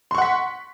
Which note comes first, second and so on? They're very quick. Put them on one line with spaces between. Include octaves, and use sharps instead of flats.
C6 C#6 F#5 B6